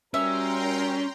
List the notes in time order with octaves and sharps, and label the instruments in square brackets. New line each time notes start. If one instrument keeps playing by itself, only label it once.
[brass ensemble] G3 F#4 A#4 [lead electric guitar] C#4 [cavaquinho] E5 [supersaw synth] G5 A#5 C6